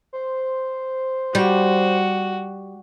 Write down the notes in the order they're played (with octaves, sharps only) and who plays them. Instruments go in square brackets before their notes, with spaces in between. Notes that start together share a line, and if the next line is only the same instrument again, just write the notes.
[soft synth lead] C5
[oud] G3 [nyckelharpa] F#4